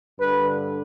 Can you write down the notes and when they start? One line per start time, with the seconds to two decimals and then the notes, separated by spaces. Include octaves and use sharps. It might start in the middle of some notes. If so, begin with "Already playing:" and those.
0.19 G2 D3 B4